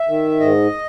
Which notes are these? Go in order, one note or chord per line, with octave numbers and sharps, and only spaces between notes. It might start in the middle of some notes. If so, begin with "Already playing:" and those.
Already playing: E5
D#3
G#2 D#5